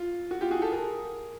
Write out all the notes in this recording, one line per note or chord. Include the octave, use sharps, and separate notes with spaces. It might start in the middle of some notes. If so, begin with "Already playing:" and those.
Already playing: F4
F#4
F4 G4
F#4 G#4
G4 A4
G#4 A#4